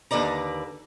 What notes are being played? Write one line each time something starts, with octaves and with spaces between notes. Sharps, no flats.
D#2 D3 B4 D5 A#5